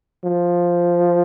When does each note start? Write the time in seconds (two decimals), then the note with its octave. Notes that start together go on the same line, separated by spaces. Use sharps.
0.24 F3